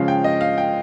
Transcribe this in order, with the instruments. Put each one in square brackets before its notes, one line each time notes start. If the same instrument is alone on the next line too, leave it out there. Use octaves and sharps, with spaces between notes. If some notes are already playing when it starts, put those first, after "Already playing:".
Already playing: [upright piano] C#3 F3 G#3 C#4 F5
G5
D#5
F5
G5